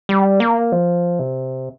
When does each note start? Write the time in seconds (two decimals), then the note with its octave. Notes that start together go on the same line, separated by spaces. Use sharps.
0.09 G3
0.40 A#3
0.72 F3
1.19 C3